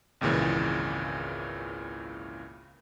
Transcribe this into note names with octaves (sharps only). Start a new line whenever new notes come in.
G#1 C#2 A#2 C#3 E3